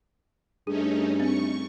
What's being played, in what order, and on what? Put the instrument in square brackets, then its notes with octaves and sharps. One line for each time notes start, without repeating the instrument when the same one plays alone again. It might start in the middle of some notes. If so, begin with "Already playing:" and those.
[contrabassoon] G2 [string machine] A3 C#4 D#4 [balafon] G#4
[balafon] C4 [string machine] C#6